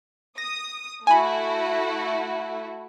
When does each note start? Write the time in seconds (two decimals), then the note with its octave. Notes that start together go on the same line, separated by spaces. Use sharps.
0.38 D#6 A#6
1.07 A3 E4 F#4 G#5 B5